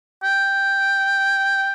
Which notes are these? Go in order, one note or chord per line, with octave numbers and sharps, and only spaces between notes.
G5